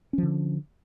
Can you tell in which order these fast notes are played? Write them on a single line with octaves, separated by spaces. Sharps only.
C#4 F3 D3